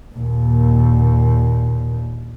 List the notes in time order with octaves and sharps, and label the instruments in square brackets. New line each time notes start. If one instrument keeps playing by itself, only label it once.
[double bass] D#2 A#2